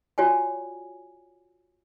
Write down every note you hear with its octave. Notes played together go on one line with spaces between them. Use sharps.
F4 F#4 C#5 D5 G5 G#5